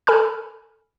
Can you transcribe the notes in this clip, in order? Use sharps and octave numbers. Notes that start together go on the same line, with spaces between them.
A4 G#5 B5 F6